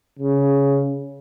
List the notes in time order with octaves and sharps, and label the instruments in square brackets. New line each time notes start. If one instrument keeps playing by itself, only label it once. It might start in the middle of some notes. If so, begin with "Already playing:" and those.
[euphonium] C#3